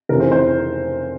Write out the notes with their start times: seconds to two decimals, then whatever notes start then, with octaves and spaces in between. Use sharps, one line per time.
0.09 F1 F2 C#3 E3 A#4
0.20 C5
0.32 C5